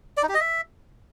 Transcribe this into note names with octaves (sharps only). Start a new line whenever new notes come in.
D5
D#4
G4
D#5
E5